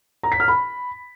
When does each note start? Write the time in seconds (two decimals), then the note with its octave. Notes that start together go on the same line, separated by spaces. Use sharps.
0.23 A#5
0.32 B6
0.40 F6
0.48 B5